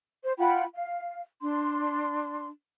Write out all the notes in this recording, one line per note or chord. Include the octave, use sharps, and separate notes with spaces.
C5
F4 F#5 G5 B5
F5
D4 C6